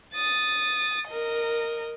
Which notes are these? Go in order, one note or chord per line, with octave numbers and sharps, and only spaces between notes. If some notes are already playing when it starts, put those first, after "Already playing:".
D#6 A6
A#4 D#5